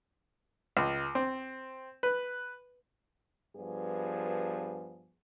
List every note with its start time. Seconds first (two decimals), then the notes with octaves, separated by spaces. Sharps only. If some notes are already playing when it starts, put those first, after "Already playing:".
0.77 C#2
1.15 C4
2.03 B4
3.55 G2 F3 B3 G#4